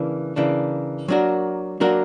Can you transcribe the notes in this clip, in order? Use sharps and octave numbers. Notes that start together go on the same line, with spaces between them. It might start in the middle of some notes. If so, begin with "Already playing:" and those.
Already playing: C#3 E3 A#3 D4
C#3 E3 A#3 D4
F#3 A#3 D4 F#4 A#4
F#3 A#3 D4 F#4 A#4